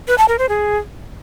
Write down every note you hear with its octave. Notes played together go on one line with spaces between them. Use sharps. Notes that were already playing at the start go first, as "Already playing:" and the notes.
B4
A5
A#4
C5
G#4